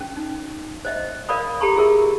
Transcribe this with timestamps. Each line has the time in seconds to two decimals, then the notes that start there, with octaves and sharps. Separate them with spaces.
0.01 C#4
0.17 D#4
0.85 C5 D#5 E5
1.29 A#4 D5 F5 B5 D#6
1.61 G4 A4 A#5 B5 C#6
1.76 F4 G#4 A#4 E5